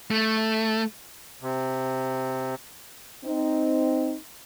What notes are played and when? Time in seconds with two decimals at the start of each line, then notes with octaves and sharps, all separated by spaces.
0.11 A3
1.42 C3
3.24 C4 D#4